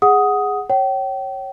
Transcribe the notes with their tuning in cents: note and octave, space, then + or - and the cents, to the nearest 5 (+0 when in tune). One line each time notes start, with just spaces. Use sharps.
G#4 -10 F#5 +0 D#6 +10
C#5 -15 G5 -35